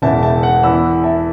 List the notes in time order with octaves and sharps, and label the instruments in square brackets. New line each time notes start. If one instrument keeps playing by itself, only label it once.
[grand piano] E1 E2 C#3 E5 A5
E5 A5
F#5
E2 E3 B5 E6
E5 A5